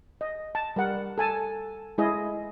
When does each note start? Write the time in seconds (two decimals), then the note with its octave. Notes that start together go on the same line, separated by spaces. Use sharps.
0.21 D#5
0.55 A5
0.76 G3 A#4 F#5
1.18 A4 G#5 A5
1.98 G#3 E4 G#4 D#5